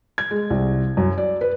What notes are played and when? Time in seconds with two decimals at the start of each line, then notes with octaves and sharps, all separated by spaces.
0.18 G#6
0.31 G#3
0.50 C2
0.97 F#2
1.18 D5
1.41 B4